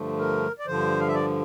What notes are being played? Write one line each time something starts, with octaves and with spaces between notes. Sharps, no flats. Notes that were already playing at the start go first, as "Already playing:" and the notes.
Already playing: G2 D3 F3 A3
A#4
D5
G2 D3 F3 C5
F5
E5
D5